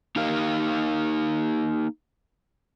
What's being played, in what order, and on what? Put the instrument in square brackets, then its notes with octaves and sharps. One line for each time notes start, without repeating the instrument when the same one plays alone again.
[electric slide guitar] A#3 D#4 G4 A#4 F5